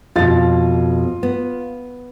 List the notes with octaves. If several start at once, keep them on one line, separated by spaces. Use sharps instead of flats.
F2 B2 F4 A6
B3